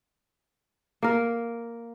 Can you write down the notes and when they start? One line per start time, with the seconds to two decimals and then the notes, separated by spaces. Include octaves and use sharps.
1.02 A#3 A#4